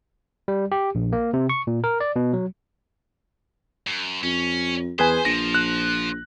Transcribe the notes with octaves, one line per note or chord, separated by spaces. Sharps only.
G3
G4
A#1
A#3
C3
C#6
A#2
A#4
D5
B2
F#3
F#2
F2 C#4
E2 G#4 B4 C5 G#5
A#1 F3 A#6
F#6